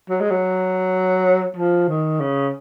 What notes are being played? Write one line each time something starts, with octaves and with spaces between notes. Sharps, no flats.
F#3
G#3
F#3
F3
D#3
C#3